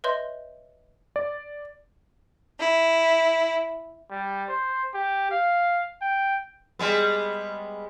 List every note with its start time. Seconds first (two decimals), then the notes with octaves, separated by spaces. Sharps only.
0.04 B4 C#5 D#5 E5 C6 G6
1.16 D5
2.59 E4
4.11 G3
4.49 C5
4.94 G4
5.31 F5
6.02 G5
6.79 G3 G#3 B3